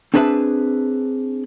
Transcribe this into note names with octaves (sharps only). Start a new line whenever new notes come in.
C4 D4 G#4 B4 E5 A5